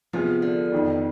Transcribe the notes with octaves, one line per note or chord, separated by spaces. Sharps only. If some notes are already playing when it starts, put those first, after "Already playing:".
C3 F3 B3 F4 G#4
D3
F2 D#3 B3